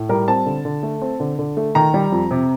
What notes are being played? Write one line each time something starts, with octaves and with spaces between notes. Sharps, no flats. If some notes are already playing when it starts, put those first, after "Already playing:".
Already playing: A2
G3 A#4
C4 A5
D3
D3
A3
C4
D3
D3
A3
D#3 A#5
G3
F2
C3